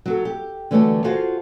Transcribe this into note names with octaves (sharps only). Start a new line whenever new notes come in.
F#3 F#4 A4
G4
D3 E3 G3 A3 F#4 C#5
F4 F#4 G#4 A4 C5 F5